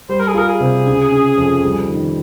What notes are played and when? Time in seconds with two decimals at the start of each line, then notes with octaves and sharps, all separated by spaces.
0.09 G3 C5
0.20 A#4
0.28 G#4
0.34 F4 A#4
0.48 G#4
0.60 C3
0.87 C#3
1.12 C#4
1.37 F2
1.63 G3
1.89 D#3